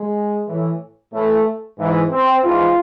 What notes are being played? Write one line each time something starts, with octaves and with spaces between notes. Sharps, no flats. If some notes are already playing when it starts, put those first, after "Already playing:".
Already playing: G#3
A2 E3
A2 E3 A3
G#2 E3
C4
G#2 E3 F4